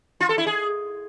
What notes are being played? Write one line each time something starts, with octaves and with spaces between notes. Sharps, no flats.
F4
A4
E4
G#4